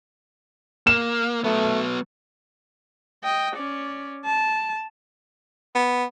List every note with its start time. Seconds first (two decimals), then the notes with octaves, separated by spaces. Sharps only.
0.87 A#3 E7
1.44 F#3 A3 B3
3.24 D#5 G5
3.56 C#4 D5
4.25 A5
5.75 B3